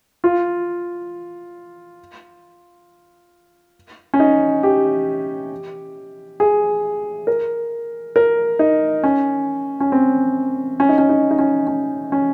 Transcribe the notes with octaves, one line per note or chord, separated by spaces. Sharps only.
F4
C#4
D#4
G4
G#4
A#4
A#4
D#4
C#4
C#4
C4
C#4
D#4
C#4
D#4
D#4
C#4
C#4
C#4